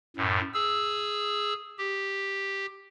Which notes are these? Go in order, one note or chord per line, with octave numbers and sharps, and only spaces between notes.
F#2 A2
G#4 E6
G4